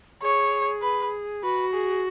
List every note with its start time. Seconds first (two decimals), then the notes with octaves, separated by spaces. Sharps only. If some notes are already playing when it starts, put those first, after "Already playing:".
0.22 G#4 C#5
0.82 B4
1.43 F#4 B4
1.73 G#4